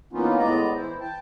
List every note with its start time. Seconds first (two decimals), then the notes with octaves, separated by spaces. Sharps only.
0.13 E3 A#3 B3 C#4 D#4 F4
0.38 A2 G#3 B3 D5 D#5 A#5
0.76 E3 E4 C5
1.00 G5 A5